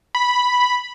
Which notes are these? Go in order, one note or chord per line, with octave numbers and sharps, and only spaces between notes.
B5